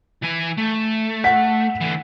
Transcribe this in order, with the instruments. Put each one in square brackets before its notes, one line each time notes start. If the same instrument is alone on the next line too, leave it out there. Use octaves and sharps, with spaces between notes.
[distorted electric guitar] E3 G#5
A3
[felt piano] F#5 B6
[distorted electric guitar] D3 E3